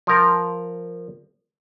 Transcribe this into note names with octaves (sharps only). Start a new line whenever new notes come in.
F3 A#4